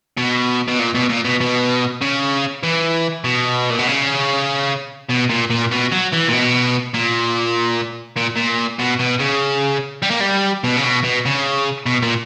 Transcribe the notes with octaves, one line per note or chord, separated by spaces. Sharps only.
B2
B2
A#2
B2
A#2
B2
B2
C#3
E3
B2
A#2
B2
C#3
B2
A#2
A#2
B2
F#3
E3
A#2
B2
A#2
A#2
A#2
B2
B2
C#3
G3
A#3
G3
B2
C#3
B2
B2
C#3
B2
A#2